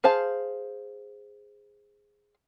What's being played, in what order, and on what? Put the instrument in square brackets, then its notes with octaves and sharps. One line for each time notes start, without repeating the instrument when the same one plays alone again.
[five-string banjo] G#4 C5 F5 A5